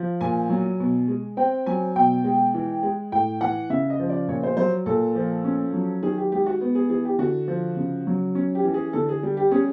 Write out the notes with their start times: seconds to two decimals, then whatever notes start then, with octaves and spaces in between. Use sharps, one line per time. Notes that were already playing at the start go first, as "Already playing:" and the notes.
Already playing: F3
0.21 A#2 G#5
0.50 F#3
0.80 B2
1.08 G#3
1.37 C4 G5
1.66 F#3 G#5
1.96 B2 G5
2.24 G#3
2.54 E3
2.83 G#3
3.12 A2 G5
3.41 E3 F#5
3.70 C#3 E5
3.90 D#5
3.99 F3
4.10 D5
4.28 A#2 C#5
4.43 C5
4.57 F#3 C5
4.86 A#2 A4
5.15 F3
5.45 C#4
5.74 F#3
6.02 D#3 G#4
6.18 G4
6.32 G#3 G4
6.46 F#4
6.61 B3
6.75 G#4
6.90 E3 G#4
7.05 G4
7.19 D3 F#4
7.48 F3
7.77 C#3
8.07 F#3
8.35 C#4
8.55 G4
8.64 E3
8.74 G#4
8.93 D3 A4
9.09 G#4
9.23 G3
9.37 G4
9.52 C#4 G#4